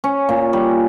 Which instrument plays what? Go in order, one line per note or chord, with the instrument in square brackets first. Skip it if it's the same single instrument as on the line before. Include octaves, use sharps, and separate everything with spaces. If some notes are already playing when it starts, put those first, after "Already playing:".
[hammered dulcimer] C#4
A#2
G3